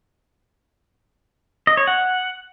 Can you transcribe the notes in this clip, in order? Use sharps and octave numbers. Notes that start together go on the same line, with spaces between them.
D#5
C#5
F#5